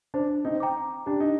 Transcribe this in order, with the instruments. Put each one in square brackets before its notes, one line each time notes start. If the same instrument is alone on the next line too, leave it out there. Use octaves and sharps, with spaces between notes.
[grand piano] D4 [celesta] C5
[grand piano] C4 D#4
[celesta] G5 A#5 D6
[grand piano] D4 [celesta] G4
[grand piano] D#4